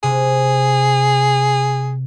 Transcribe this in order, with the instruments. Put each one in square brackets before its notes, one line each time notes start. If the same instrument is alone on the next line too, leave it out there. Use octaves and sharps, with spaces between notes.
[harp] C3 [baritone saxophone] G#4